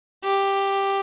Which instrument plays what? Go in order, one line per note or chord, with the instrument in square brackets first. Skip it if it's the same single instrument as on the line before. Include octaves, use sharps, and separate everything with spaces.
[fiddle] G4